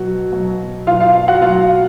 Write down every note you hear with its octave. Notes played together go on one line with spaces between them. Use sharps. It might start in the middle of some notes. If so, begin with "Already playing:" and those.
Already playing: B2 F#3 F#4
B2 F#3
B2 F#3 F4 F5
F4 F5
F#4 F#5
B2 F#3 F4 F5